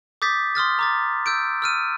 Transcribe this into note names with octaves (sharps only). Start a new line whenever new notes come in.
D6 D#6 G6 A6 B6
C6 D#6 F6 A6
A#5 D6 A6
E6 G6 D7
E6 F6 D#7